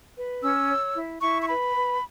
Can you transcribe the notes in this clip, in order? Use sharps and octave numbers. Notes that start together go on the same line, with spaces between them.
B4
C#4 E6
C#5
E4
E4 C#6
C#6
B4 B5
B4